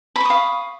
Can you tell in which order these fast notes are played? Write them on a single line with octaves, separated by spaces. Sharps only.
B5 C#6 D#6 F5